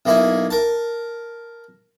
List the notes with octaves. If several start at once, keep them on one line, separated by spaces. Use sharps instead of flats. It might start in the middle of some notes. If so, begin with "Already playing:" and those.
B1 A#3 E4 G#5
A#4 A5